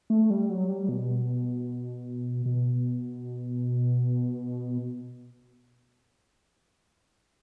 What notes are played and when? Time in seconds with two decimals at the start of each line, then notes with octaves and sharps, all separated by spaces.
0.10 A3
0.30 G3
0.50 F#3
0.69 G3
0.89 B2
2.46 B2